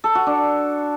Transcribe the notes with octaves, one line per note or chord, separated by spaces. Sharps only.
A4
F#4
D4